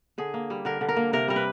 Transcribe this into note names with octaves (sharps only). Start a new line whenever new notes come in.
D3 G#4
A#3
G3
D3 A#4
D3
A#4
A#3
C3 A#4
G3 A#4
B4